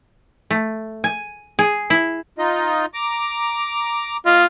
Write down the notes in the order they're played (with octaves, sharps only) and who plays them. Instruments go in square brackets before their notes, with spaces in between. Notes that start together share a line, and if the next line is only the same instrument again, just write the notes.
[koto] A3
G#5
G#4
E4
[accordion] D#4 F4 D#5
A#5 D6
[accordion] A#3 D#5 [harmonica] F4